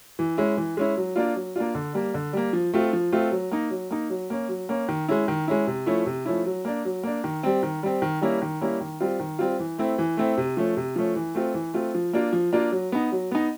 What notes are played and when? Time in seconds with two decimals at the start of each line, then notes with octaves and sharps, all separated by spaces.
0.19 E3
0.38 G#3 C#4 E4
0.57 E3
0.77 G#3 C#4 E4
0.97 F#3
1.16 A#3 D4 F4
1.35 F#3
1.56 A#3 D4 F4
1.75 D3
1.94 G3 A#3
2.14 D3
2.33 G3 A#3
2.53 F3
2.73 A3 C4 F4
2.93 F3
3.12 A3 C4 F4
3.31 F#3
3.51 A#3 D#4
3.70 F#3
3.91 A#3 D#4
4.10 F#3
4.30 A#3 C#4
4.49 F#3
4.69 A#3 C#4
4.88 D#3
5.08 G#3 C#4 E4
5.28 D#3
5.48 G#3 C#4 E4
5.67 C3
5.86 F3 A3 C#4 E4
6.06 C3
6.25 F3 A3 C#4 E4
6.46 F#3
6.65 A#3 D4
6.85 F#3
7.03 A#3 D4
7.24 D#3
7.43 G3 C4
7.63 D#3
7.83 G3 C4
8.02 D#3
8.21 G3 A#3 C#4 E4
8.42 D#3
8.61 G3 A#3 C#4 E4
8.81 D#3
9.00 G3 C4 F4
9.20 D#3
9.39 G3 C4 F4
9.59 E3
9.78 A3 C4 E4
9.98 E3
10.17 A3 C4 E4
10.37 C3
10.57 F3 A3 C#4
10.77 C3
10.96 F3 A3 C#4
11.15 E3
11.35 A3 C4 F4
11.54 E3
11.74 A3 C4 F4
11.94 F3
12.13 A#3 D4 F4
12.33 F3
12.53 A#3 D4 F4
12.72 F#3
12.92 B3 D#4
13.12 F#3
13.31 B3 D#4